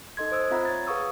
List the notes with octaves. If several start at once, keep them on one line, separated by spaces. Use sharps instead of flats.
D#4 A4 D#5 C6 G#6
C5 D#6 E6 G#6
C4 F4 E5 F#5 A#5 B5
C#5 G#6 A6
G#4 B4 F5 C#6 D#6 E6